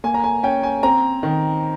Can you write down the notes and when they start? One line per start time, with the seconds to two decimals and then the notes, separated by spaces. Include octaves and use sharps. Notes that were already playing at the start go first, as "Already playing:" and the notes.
0.04 A#3 G#5
0.14 A#5
0.24 G#5
0.43 C#4 G5
0.63 G#5
0.83 C4 A#5
1.23 D#3